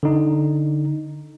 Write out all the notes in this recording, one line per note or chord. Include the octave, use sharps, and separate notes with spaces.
D3 D#4